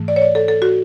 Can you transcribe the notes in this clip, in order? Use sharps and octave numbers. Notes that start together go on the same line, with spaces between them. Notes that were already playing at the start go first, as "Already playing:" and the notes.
Already playing: G#2 E3 A3
D5
C#5
D5
A4
A4
F#4